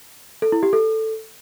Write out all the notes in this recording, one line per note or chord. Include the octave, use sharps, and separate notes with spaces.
A4
E4
G4
A4